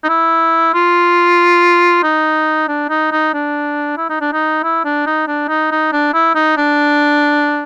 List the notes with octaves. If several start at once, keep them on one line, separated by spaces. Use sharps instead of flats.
D#4
E4
F4
D#4
D4
D#4
D#4
D4
E4
D#4
D4
D#4
E4
D4
D#4
D4
D#4
D#4
D4
E4
D#4
D4